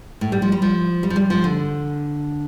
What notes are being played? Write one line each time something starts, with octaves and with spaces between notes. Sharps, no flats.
A2
G3
F3
G3
F3
G3
F3
G3
F3
D3